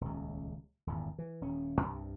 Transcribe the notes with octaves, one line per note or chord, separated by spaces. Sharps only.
D#1 C#2
D#1 G#1 E2
E3
D#1 C#4
C2 G2 C3